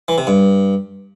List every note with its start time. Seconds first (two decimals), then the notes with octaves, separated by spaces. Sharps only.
0.08 E3
0.18 C3
0.27 G2